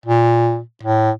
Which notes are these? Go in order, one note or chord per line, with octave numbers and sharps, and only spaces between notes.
A#2
A2